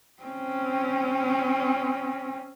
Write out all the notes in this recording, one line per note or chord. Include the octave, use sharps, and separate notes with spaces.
C4 C#4